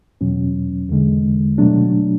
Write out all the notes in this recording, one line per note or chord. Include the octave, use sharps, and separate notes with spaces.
E2 B2 F#3 C#4
E2 D3 G#3
B2 F#3 A3 D4